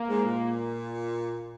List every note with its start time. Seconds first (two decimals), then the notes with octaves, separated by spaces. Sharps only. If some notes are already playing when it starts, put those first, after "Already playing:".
Already playing: A#3
0.08 G#2
0.24 A#2